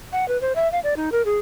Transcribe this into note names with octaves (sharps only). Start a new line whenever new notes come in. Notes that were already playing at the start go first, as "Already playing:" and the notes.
F#5
B4
C5
E5
F5
D5
D#4
A#4
G#4